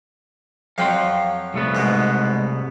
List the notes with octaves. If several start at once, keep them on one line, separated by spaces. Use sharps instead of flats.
F2 F#3 F5 G5 C6
C2 A3 B3
G#2 B2